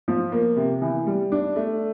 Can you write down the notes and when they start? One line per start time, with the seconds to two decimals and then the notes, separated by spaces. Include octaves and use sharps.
0.08 F3
0.32 A#3
0.56 C3
0.82 E3
1.07 G3
1.32 D4
1.56 A3